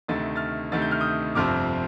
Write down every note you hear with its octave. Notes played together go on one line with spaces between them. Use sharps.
D2 C3 D#3 A3 A6
F6 A6
D2 C3 D#3 A3 A6
G6
F6
D#6 G6
G1 F2 C3 F3 C4 D6 F6